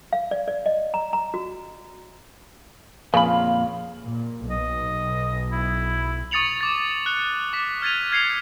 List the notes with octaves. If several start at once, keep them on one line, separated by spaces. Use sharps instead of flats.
F5
D5
D5
D#5
A#5
A#5
F#4
F2 A#2 C#3 F5 B5
A#2
B1 D#5
E4
C#6 D#6 A6 C#7 F7 F#7
D6 A6
F#6 C#7
D6 B6
F6 G#6 A6 B6 D#7 F7
F6 G#6 C7 C#7 F7